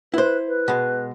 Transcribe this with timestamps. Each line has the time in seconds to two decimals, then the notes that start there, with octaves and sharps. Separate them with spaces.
0.14 E4 B4 C5
0.48 B4
0.68 B2 G#3